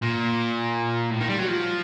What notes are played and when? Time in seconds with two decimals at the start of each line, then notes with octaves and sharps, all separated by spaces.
0.03 A#2
1.11 A2
1.20 D#3
1.29 G3
1.39 F#3
1.48 F3